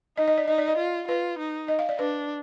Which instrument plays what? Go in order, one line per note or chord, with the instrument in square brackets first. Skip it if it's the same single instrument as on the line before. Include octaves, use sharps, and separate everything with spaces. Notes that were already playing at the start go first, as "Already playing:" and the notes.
[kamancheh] D#4 [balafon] D#5
[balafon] D#5
D5
[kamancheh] D#4 [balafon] D#5
[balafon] D5
D#5
[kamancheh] F4
[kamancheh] F4 [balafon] B4
[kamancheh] D#4
[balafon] D#5
F5
D5
[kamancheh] D4 [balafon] B4